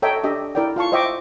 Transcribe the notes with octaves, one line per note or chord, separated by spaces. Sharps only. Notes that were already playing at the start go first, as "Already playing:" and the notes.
A4 C#5 D#5 E5 G5 A#5
D4 G4 D#5 E5
E4 A#4 D5 E5 G5
F4 F5 A5 C#6
C5 D#5 E5 G5 C#6 D6